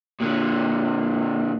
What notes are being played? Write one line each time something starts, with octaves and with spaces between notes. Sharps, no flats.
A#2 D3